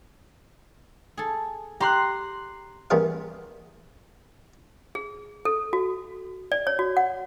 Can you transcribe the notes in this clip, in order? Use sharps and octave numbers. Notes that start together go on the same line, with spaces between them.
G#4 A4
G4 A#5 C6 F#6
A1 G3 B3 G#4 A#4 F5
G#4
A4
F#4
D5
C#5
F#4
F#5